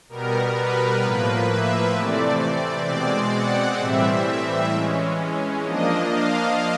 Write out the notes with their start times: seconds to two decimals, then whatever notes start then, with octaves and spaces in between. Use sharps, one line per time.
0.09 B2 G3 B3 A#4
0.55 B4
1.02 A2 F3 A#3 B4
1.48 E5
1.94 C3 E3 A3 C4 D5
2.86 B2 G#3 C4 D5
3.32 F#5
3.78 A2 E3 G3 C4 E5
4.71 E3 G#3 C#4
5.63 F3 A#3 D4 D#5
6.09 F5